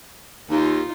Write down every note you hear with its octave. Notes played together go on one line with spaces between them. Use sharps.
D#2 D#4 F4